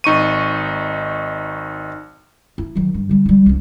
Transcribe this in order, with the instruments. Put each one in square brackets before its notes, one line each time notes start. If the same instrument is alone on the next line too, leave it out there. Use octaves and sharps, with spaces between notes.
[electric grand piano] G#1 D#4 C#6 D#7
[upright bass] E4
D#3 F#3
G2
D3 G3
G3 E4
C2 D3